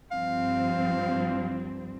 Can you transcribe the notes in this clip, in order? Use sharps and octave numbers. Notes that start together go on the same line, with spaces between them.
G2 F3 C4 F5